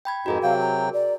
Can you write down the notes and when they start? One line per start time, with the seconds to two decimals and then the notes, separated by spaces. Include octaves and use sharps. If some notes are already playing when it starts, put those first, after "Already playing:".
0.05 G5 B5 G#6
0.26 F2 G#2 D#4 F#4 G#4 A#4
0.43 C3 F#3 F5 G5
0.61 A#5
0.93 D5